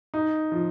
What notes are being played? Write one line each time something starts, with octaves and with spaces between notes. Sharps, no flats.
D#4
F3